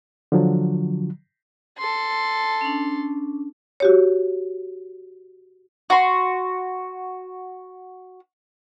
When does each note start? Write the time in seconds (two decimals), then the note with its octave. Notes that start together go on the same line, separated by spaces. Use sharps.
0.32 D3 F3 F#3
1.78 A4 C6
2.61 C#4 D4
3.80 F#4 G4 C#5
5.90 F#4 C6